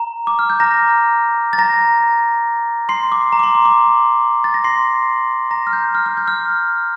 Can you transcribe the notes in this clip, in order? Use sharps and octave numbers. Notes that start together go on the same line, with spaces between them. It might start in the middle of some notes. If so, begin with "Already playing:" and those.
Already playing: A#5
D6
F6
G6
A#5 A#6
A6
A#5 A#6
C6 C7
D6
A#5
D6
C6
D6
D6
A6
A#6
C6 C7
A#5 A#6
F6
G6
F6
F6
G6
F6